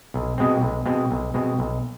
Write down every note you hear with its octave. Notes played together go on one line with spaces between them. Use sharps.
B1
B2 G#3 C4
B1
B2 G#3 C4
B1
B2 G#3 C4
B1